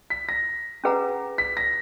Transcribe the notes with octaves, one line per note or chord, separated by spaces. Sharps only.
B6
A#6
C#4 G#4 B4 F#5 A#5
B6
A#6